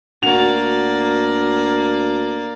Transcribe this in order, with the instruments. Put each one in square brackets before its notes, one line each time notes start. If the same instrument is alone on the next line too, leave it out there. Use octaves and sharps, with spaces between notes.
[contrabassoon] D2 [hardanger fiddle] A#3 D5 [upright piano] F#4 F7